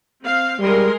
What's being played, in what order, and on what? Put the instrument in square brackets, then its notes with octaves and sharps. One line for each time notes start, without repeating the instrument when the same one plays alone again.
[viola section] C4 F5
[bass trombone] G3 [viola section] G#3 A#4 C6